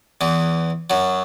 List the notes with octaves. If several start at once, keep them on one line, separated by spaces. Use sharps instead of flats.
E2 E3
F#2 F#3